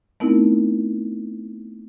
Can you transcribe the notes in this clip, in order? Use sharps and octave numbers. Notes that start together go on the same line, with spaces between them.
A3 B3 C4 D#4 E4 A#4